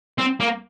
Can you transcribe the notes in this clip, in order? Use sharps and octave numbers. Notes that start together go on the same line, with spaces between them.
C4
A#3